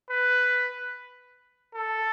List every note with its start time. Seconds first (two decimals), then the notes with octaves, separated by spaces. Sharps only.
0.10 B4
1.75 A4